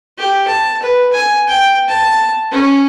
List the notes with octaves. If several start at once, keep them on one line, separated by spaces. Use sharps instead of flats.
G4
A5
B4
G#5
G5
A5
C#4